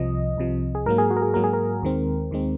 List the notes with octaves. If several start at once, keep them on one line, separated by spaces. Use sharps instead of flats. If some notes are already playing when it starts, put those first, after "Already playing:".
Already playing: C2 C3 F3 D#5
C2 C3 F3
G#4
G#2 F#3 A#3 A#4
G#4
F#4
A#4
G#4
G#2 F#3 A#3 A#4
G#4
A#4
D#2 D#3 G#3 C4
D#2 D#3 G#3 C4